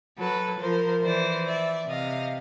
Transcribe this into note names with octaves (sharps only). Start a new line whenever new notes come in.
F#3 A4 B4
F3 A#4 C5
E3 C5 D5
D5 E5
C3 D#5 F5